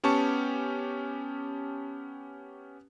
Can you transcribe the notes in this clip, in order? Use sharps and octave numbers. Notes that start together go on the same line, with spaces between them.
B3 C#4 G4 A5 C#6 C#7